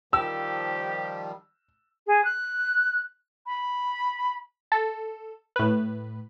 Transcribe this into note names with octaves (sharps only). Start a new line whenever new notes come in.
D#3 F3 G3 G4 E6
G#4
F#6
B5
A4
A2 B4